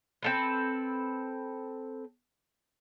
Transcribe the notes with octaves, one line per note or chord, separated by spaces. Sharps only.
C4 A4 B4